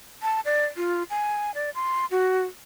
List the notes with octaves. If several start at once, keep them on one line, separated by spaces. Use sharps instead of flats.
A5
D5
F4
G#5
D5
C6
F#4